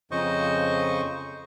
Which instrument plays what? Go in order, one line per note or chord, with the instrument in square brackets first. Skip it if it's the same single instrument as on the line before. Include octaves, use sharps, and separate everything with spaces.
[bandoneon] F2 C#3 C5 D#5 C#6